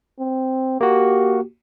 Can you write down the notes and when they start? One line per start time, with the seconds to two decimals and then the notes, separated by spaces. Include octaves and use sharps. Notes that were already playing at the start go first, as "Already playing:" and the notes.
0.20 C4
0.81 A#3 F#4 G4